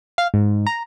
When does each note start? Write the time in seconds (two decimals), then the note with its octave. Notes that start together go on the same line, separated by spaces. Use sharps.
0.18 F5
0.34 G#2
0.67 A#5